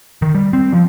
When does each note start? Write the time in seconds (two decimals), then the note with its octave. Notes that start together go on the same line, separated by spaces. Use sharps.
0.22 D#3
0.35 G3
0.53 C4
0.73 F3